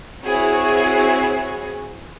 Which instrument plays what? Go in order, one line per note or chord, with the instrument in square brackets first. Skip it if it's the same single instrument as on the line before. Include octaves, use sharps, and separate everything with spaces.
[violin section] C4 E4 F#4 G#4 C#5